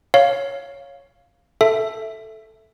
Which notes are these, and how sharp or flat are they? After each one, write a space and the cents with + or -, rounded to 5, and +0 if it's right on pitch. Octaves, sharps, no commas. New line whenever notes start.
C#5 +0 F5 +0
A4 +0 E5 +0